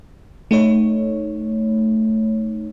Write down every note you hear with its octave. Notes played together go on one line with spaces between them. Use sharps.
A3 D#4 C#5